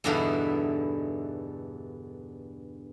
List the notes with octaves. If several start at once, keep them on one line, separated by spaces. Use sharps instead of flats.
E2 G2 B2 D3 D#4 E4